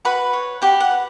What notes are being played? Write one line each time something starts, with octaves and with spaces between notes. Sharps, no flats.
F#4 B4 B5
C#5
F#4 G4 G5
F#5
B4